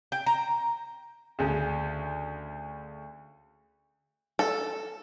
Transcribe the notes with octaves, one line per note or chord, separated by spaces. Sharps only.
G5
A#5
D2 C#3
A4